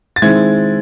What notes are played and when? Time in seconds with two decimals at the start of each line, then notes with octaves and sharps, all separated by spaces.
0.16 A6
0.22 D#3 G#3 C4 E4 G#6